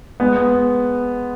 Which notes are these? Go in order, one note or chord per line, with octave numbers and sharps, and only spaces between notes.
G#3 B3